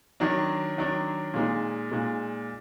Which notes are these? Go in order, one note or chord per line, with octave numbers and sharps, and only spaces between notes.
D#3 F#3 D4
D#3 F#3 D4
A#2 G#3 D#4
A#2 G#3 D#4